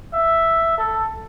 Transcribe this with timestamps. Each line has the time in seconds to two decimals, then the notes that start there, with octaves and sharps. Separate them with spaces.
0.13 E5
0.78 A4